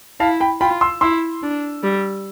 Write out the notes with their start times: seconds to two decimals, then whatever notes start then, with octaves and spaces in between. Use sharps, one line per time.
0.20 E4 F5 A5
0.40 G5 B5
0.61 F4 G5 B5
0.81 C6 E6
1.01 E4 C6 E6
1.43 D4
1.83 G3